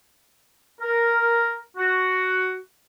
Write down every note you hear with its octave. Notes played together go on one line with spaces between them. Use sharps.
A#4
F#4